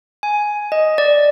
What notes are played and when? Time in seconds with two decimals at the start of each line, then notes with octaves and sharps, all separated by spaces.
0.23 G#5
0.72 D#5
0.98 D5